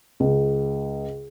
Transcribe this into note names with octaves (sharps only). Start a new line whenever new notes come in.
C#2